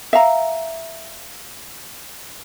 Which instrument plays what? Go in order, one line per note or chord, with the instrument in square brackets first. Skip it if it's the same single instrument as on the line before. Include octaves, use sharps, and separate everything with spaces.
[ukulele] E5 F5 A#5